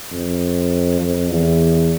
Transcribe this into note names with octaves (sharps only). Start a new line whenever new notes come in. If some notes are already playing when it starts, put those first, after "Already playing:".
F2
F2
E2